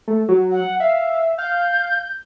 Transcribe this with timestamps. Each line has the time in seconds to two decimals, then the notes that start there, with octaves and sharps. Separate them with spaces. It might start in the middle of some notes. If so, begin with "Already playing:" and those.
0.08 A3
0.29 F#3
0.51 F#5
0.80 E5 F5
1.38 F5 G6